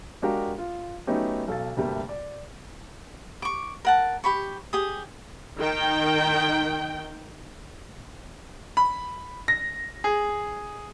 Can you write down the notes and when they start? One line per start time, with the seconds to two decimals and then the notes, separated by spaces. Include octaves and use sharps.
0.22 G#3 D4 F#4 G4 A#4 F5
0.58 F4
1.07 F#3 A3 B3 C#4 D#4 G4
1.48 B1 A4 F5 A6
1.76 D2 G2 C3 G3 A3 A#3
2.09 D5
3.42 C#6 D6
3.85 A#4 F#5 A5
4.24 G4 B5 C#6
4.73 G4 G#4 D#6
5.60 D#3 G5
8.77 B5
9.48 A#6
10.04 G#4